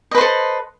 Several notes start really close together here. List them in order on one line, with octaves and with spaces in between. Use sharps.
D#5 B4 C5 A4